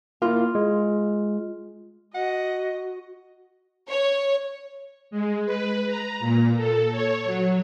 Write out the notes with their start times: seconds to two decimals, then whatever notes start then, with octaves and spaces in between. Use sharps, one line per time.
0.22 A#3 E4 F4
0.55 G#3
2.15 F#4 D#5 F#5
3.88 C#5
5.11 G#3
5.46 B4
5.87 A#5
6.20 A#2
6.56 A4
6.91 C#5
7.25 F#3